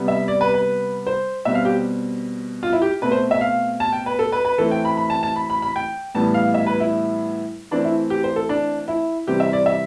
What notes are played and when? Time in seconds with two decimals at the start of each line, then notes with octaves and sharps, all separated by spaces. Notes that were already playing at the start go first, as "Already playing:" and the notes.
Already playing: C3 G3 B3
0.08 E5
0.28 D5
0.41 B4
0.54 B4
1.06 C5
1.45 B2 G3 C4 E5
1.55 F5
1.65 G4
2.63 F4
2.73 E4
2.82 G4
3.02 B2 A3 C4 B4
3.11 C5
3.31 E5
3.41 F5
3.80 A5
3.93 G5
4.06 B4
4.19 A4
4.32 B4
4.45 B4
4.58 E3 A3 C4 A4
4.71 G5
4.85 B5
4.97 B5
5.10 A5
5.23 A5
5.36 B5
5.50 B5
5.62 B5
5.76 G5
6.15 A2 E3 G3 B3 A5
6.34 F5
6.54 E5
6.67 B4
6.80 E4
7.71 E3 A3 C4 D4
7.84 E4
8.10 G4
8.24 C5
8.36 A4
8.49 D4
8.88 E4
9.27 C3 E3 G3 C4 G4
9.40 E5
9.53 D5
9.66 E5